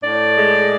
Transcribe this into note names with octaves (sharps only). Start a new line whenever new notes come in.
A2 D5
G#3